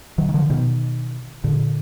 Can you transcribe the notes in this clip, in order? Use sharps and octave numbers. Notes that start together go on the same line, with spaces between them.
D#3 F#3
D#3
D3 F3
B2 D#3
A#2 D3